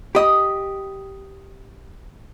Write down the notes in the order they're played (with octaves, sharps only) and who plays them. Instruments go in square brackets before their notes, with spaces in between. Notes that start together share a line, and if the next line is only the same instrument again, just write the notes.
[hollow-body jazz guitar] G4 D#5 [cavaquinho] B5 D#6